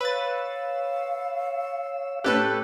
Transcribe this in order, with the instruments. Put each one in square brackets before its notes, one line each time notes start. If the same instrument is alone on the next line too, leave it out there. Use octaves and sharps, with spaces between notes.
[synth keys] B4 A6 [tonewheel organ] C#5 E6 [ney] F5
[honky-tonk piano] A2 C#4 F#6 [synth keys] G4 A4 B4